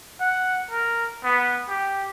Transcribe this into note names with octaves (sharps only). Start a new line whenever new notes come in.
F#5
A#4
B3
G4